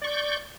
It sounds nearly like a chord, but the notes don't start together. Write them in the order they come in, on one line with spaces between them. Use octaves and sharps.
D5 C#6 G6